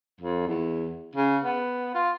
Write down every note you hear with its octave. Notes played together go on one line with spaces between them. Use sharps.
F2
E2
C#3
B3
F4